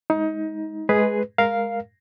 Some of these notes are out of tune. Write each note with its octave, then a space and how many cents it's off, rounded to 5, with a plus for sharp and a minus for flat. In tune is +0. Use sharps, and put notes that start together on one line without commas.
G#3 +0 D#4 +25
G#3 +20 G#4 +0 B4 +0
G#3 +0 A#4 +0 F5 +0